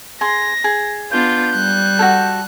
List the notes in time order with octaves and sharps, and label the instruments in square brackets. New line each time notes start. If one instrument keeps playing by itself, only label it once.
[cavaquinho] G#4 C6 [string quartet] A#6
[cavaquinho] G#4
[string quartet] B3 D4 F4 [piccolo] G6
[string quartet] G3 F#6
[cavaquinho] F#4 G#4 A4